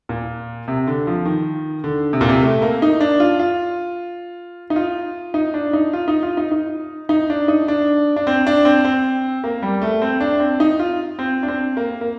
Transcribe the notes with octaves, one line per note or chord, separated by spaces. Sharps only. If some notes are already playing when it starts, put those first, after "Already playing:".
A#2
C3
D3
F3
D#3
D3
C3
A#2
C3
A3
A#3
D#4
D4
F4
F4
D#4
F4
D#4
D4
D#4
F4
D#4
F4
D#4
D#4
D#4
D4
D#4
D4
D4
C4
D4
C4
C4
A#3
G3
A3
C4
D4
C4
D#4
F4
C4
D4
C4
A#3
A#3